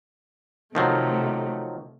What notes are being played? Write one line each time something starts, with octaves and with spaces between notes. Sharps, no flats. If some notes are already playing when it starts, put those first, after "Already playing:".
C3 D#3 F3 F#3 A3